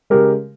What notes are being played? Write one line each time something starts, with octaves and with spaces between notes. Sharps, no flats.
C#3 G#3 G4 A#4